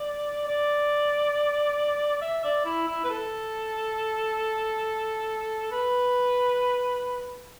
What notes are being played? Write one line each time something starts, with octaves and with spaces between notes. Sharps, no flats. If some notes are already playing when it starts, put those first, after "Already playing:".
Already playing: D5
D5
E5
D5
E4
E4
B4
A4
B4